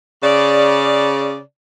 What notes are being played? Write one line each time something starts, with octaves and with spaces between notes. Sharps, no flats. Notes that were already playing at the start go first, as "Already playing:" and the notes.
C#3 D5